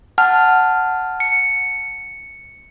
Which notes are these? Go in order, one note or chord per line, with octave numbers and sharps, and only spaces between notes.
F#5 A5 F6
C#7